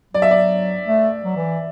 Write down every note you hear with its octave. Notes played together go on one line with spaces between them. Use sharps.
F#3 D5
E5
D5
A3
F#3
E3